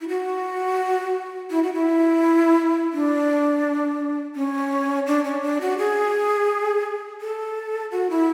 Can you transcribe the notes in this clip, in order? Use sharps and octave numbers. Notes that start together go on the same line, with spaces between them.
E4
F#4
E4
F#4
E4
D4
C#4
D4
C#4
D4
F#4
G#4
A4
F#4
E4